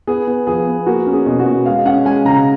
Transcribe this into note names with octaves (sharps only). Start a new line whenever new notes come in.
B3 G#4
B3
F3 G#4
B3
A#3 F#4
C#4
G#4
B2
F#4
B2
G#3 F5
C#4 F#5
G#3 G#5
C#3 A#5